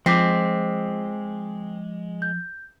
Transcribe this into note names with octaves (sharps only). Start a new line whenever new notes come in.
F3 G#3 C4 D6 B6 C7
G6